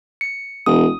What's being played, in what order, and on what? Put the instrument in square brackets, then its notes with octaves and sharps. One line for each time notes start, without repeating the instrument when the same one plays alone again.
[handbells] C#7
[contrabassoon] E1 [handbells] D#6